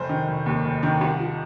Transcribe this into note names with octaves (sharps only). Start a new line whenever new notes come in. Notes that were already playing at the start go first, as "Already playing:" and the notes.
Already playing: F1 C5
D#3
F1
D#2
F1
D#3
C2
F3